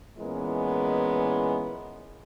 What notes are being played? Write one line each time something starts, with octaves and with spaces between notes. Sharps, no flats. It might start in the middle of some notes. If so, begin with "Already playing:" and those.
A#2 E3 G#3 B3 C#4 A#4